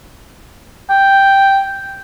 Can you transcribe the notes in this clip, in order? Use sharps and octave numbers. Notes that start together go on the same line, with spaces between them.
G5